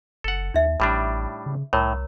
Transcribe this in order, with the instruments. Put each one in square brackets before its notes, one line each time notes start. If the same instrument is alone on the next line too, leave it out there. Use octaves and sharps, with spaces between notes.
[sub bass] F#1 [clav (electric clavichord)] A4 F#5
[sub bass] D#2 [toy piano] D#4 E5
[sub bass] A1 [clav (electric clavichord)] A2 G3 D4
[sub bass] C#3
[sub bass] C2 [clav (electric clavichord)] A2 [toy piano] A#4 C#5 A#5